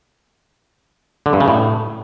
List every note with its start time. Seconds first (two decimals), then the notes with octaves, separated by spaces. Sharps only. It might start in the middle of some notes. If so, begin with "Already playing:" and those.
1.26 D3
1.33 G2
1.40 C#3
1.48 A2